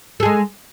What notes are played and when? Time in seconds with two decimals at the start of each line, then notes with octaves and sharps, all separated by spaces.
0.20 A4
0.23 G#4
0.25 G#3